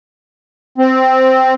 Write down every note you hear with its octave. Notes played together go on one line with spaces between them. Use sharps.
C4